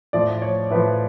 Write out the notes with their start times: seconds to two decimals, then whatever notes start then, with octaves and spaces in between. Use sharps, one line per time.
0.13 A2 F3 D5
0.42 C#5
0.71 A2 F3 B4